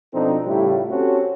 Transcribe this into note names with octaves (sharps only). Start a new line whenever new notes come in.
B2 F3 C4 D4 D#4 A4
A2 C#3 G3 E4 F4 G4
C4 C#4 F#4 G4 A4